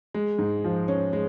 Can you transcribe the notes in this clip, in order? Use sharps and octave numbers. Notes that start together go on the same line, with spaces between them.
G#3
G#2
F3
C#4
G#3